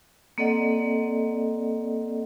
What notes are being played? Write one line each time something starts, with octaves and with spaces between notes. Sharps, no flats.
A#3 C4 A4 D5 D#5 F#5